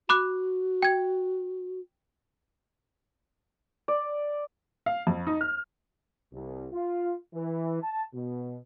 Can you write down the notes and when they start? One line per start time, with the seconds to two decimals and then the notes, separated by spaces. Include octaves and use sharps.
0.09 F#4 B5 D6 F#6
0.82 G5 G#6
3.88 D5
4.86 F5
5.07 F2
5.27 D#4
5.41 F6
6.32 C2
6.73 F4
7.34 E3
7.82 A5
8.14 B2